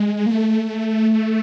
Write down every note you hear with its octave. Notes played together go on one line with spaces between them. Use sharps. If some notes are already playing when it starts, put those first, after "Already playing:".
Already playing: G#3
A#3
A3